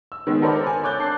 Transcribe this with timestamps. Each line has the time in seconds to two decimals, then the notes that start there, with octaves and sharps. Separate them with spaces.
0.12 E6
0.27 D#3 G#3 B3
0.42 A4 A#4 C5 D5 B5
0.67 G#5
0.84 C#5 D6 F#6 G6 A6
0.99 D4 A5 C7